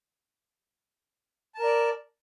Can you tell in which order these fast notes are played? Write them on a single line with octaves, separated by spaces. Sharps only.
A5 A#4 D5